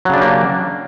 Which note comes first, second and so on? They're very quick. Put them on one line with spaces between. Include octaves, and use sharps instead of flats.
F#3 C#3 D4 G4 A#3